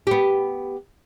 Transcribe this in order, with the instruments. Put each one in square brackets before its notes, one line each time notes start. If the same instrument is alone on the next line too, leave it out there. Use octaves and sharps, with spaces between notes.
[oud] B3 G4